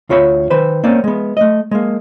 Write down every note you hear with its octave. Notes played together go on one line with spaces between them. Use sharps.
D2 F4 C#5 E5 B5
D#3 B4 C5
A#3 C4 C#4 D5
G#3 B3
A3 D#5
G#3 A#3